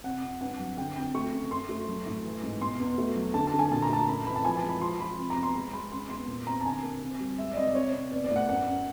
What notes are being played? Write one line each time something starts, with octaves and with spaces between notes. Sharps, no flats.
C3 F#5
F2
G2 F#5
F#3
D3 G5
F2 G5
A3 C#6
C#3
F#2 C6
A3
F#3
A2
E3
G#2
B2 C6
E2
A3
F#3
D3 A5
A5
D3
G#5
A#2 A5
A#5
A3 A5
F#2 B5
E3 B5
A5
F3 G#5
A5
G#3
B5
F3 C6
F3 B5
C3
A#5
E2
C6
G#3 B5
G#3 B5
C#3 C6
E2 C6
A#2
C4 A#5
A5
D3 G#5
A#3
C4
G3
G#3 E5
D5
C3 D#5
D5
C3 C#5
C3
B3 D5
D5
A2
F#5
F#2 F#5
F#2